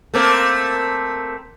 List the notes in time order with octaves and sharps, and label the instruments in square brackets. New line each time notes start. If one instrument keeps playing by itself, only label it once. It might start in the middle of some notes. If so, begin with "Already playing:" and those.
[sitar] A3 A#3 C4